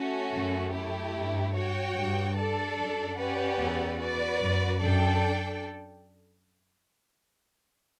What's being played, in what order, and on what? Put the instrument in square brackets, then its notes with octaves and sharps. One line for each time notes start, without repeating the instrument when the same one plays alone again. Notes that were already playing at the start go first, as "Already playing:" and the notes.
Already playing: [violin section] A3 C#4 F#4
[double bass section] F#2
[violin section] A3 E4 G4
[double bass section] G2
[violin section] F#4 C#5 G5
[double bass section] G2
[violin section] D4 A4 D5 A5
[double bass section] F#2
[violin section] C#4 G4 B4 D5 F#5
[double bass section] E2
[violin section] F#4 B4 D5
[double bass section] F#2
[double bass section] F#2 [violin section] D4 A4 D5 G5